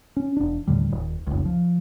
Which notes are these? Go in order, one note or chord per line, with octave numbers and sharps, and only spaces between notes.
C#4
E1 D4
D#2 A2 D3 G3
D#1
F1 C#2
F3